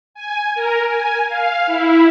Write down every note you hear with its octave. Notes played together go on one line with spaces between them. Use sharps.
G#5
A#4
G#5
F5
E4